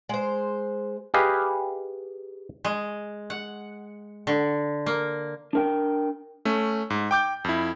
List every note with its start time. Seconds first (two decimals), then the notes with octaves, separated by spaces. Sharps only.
0.09 G#3 C5
1.14 G4 G#4 B4 D#5 F5 G#5
2.65 G#3
3.30 F#5
4.27 D3
4.86 A#3
5.53 D4 A#4 G5
6.45 A3 C#4
6.90 G#2
7.11 G5 D6 G6
7.44 F2 E4